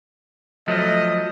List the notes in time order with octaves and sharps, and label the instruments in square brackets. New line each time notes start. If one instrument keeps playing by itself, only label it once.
[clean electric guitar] F3 F#3 A3 [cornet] D#5